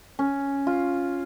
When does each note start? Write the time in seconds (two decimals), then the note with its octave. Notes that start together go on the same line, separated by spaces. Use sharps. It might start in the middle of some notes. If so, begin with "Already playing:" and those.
0.19 C#4
0.67 F4